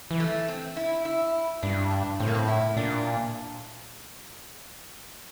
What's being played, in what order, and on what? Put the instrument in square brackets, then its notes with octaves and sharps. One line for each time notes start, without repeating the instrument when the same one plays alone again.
[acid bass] E3
[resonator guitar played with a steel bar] A3
C4
E4
E4
[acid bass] G2 [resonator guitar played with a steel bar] D4
[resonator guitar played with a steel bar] D4
[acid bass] A2 [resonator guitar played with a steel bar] C4
[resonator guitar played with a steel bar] A#3
C4
E4
[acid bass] A#2 [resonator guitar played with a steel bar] D4